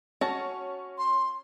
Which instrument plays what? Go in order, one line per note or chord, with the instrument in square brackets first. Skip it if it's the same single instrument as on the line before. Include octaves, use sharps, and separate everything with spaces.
[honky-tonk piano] C#4 [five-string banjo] F#4 A5
[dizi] C6